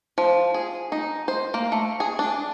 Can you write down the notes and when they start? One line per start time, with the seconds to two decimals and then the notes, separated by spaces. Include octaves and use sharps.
0.18 F3
0.54 G#4
0.92 D#4
1.28 C5
1.54 A#3
1.72 A3
2.00 G#4
2.19 D4